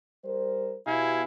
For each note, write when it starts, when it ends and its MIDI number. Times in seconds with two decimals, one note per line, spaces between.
0.24 0.76 55
0.24 0.76 70
0.24 0.76 72
0.86 1.22 47
0.86 1.23 64
0.86 1.22 67
0.86 1.24 77
0.86 1.24 80